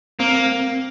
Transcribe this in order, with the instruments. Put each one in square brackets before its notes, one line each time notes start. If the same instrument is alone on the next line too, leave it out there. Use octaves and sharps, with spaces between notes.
[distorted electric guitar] A#3 [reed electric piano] C4